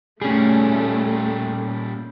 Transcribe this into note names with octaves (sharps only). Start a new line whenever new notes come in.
A#2 G3 A3 C#4 G#4